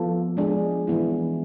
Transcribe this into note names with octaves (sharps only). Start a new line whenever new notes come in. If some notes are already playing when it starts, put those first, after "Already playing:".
Already playing: F3 B3 F4 A4
G#3 D4 G#4
E3 B3 E4